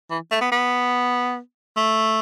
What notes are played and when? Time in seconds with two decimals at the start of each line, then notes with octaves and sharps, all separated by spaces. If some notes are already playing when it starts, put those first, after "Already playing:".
0.11 E3
0.32 A3
0.41 B3
0.52 B3
1.77 A3